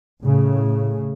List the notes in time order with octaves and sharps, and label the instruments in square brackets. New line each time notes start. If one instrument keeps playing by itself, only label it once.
[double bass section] A2 C#3